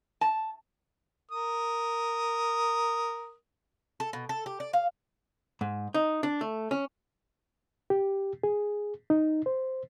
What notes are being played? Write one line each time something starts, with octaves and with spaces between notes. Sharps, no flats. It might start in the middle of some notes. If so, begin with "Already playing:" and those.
A5
A#4 D#6
A4
B2
A4
G4
D5
F5
G#2
D#4
D4
A3
C#4
G4
G#4
D#4
C5